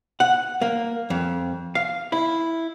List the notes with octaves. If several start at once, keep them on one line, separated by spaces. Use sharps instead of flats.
F#5
A#3
F2
F5
E4